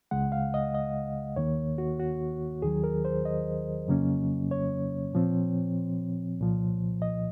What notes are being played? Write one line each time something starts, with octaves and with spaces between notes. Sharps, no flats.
C#2 C#3 G#3 F#5
F5
D#5
D#5
D#2 D#3 A#3 C#5
F#4
F#4
D#2 D#3 F#3 G#4
A#4
C5
D#5
F2 C#3 F#3 A#3 C#4
C#5
A#2 F3 C4
C2 A#2 F3
D#5